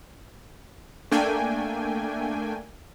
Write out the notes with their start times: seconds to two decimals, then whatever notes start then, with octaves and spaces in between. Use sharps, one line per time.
1.11 A3 A#3 D4 G5 G#5